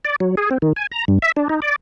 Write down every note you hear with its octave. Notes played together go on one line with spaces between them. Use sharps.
D5
F#3
G#4
C4
D#3
G#5
A#5
G2
E5
D4
D#4
D5